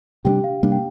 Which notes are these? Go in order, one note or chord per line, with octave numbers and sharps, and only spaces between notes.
C3 G3 A#3 D4 G4 G5
F5
C3 G3 A#3 D4
G5